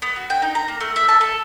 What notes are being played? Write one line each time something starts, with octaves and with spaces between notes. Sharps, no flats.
B3
F#4
G5
D#4
A#5
A#3
A3
E5
A5
A4